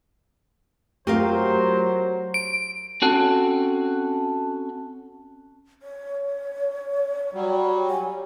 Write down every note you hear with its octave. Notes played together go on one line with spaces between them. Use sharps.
F#3 A3 C4 F4 G4 A#4 C5 F5
D7
C4 C#4 F#4 A4
C#5
F#3 G3
G#5